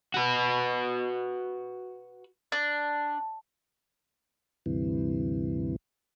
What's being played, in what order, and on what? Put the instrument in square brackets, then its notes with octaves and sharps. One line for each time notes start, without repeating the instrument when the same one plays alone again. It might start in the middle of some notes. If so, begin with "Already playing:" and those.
[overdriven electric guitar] F#4 B4
[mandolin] D4
[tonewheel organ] D2 G2 C3 E3